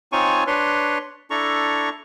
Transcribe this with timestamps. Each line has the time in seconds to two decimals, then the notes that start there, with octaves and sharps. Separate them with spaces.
0.12 C4 D#4 F4 C#5 G#5 C#6
0.47 D4 B4 C#5 C6
1.31 D4 E4 A4 A#5 C#6